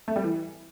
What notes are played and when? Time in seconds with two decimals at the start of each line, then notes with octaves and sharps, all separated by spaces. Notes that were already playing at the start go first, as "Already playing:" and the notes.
0.08 A3
0.16 G3
0.24 E3